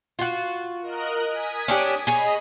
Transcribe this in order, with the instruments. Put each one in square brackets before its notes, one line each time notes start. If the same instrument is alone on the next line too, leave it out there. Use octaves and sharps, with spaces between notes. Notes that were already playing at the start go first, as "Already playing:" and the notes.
[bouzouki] F4 F#4
[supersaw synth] A#4 D#5 F#6
G#5 D#6 B6
[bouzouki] C#4 D4 G4
[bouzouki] G#4 C#5 [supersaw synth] D#5 B5